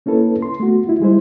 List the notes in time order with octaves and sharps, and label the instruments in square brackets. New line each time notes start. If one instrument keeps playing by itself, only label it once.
[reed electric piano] A#3 C#4 E4 A4 B4
C6
A3 B3 F#4
E4 F4
G3 G#3 E4 C5